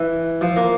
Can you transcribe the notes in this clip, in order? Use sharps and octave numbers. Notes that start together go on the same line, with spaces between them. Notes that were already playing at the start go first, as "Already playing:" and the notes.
Already playing: E3
F3
A#3